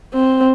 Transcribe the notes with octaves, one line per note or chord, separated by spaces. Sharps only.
C4